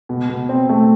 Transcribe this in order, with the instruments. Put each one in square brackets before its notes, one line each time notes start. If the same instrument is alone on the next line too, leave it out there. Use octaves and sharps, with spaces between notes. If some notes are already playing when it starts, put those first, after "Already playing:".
[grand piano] B2
B2
C4
A3